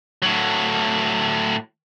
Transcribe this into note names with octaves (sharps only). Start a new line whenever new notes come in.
A2 F#3